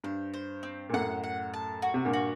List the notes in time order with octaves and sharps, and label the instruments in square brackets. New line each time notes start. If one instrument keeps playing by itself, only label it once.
[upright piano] G2 [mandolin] C5
[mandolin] C5
C4
[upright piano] A#2
[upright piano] F#2 A2 [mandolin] F#5
[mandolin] F#5
A5
F#4
[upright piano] C3
G2 A#2
[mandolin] F#4